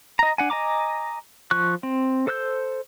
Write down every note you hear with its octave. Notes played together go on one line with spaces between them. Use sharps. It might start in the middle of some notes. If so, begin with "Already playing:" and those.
D#5 A#5
D4 F#5 G#5
D#5 G#5 A#5 D6
F3 C#6 F#6
C4
A4 C5 E6 F#6 G6